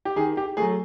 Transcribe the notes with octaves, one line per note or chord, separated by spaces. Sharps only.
G4
D#3 G#4
G4
F#3 A3 G#4